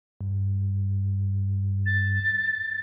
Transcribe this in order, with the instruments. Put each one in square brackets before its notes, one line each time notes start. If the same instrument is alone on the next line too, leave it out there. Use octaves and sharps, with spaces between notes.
[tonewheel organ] G2
[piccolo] A6